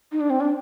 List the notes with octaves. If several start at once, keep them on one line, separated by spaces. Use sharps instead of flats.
D#4
D4
C4
D4